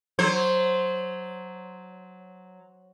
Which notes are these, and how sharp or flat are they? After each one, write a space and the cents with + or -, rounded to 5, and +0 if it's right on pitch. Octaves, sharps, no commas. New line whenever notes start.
F#3 +0 C5 +0